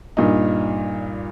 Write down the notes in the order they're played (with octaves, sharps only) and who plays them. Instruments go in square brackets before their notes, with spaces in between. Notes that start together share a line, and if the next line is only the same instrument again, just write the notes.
[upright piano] G2 A#2 D#4